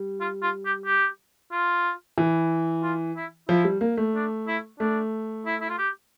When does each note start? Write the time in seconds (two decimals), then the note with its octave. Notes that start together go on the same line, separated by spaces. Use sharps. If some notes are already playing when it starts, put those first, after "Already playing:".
Already playing: G3
0.21 F4
0.43 F4
0.65 G4
0.86 G4
1.52 F4
2.18 E3
2.83 F4
3.16 E4
3.48 F3 E4
3.64 G3
3.81 A#3
3.97 A3
4.15 D4
4.48 E4
4.79 A3 D4
5.46 E4
5.61 E4
5.70 F4
5.78 G4